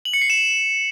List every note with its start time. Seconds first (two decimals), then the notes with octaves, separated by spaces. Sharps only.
0.05 F#7
0.13 C#7
0.22 C7
0.30 E7